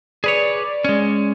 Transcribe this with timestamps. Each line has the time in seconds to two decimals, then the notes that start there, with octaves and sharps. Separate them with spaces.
0.24 G#4 B4 C#5 D5
0.85 G#3 C#4